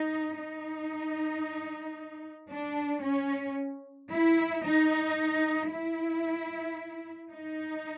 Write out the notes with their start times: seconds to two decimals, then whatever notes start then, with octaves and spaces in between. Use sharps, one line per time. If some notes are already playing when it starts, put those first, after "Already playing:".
Already playing: D#4
0.36 D#4
2.50 D4
3.03 C#4
4.10 E4
4.64 D#4
5.70 E4
7.31 D#4